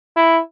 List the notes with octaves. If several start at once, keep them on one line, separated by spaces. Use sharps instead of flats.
E4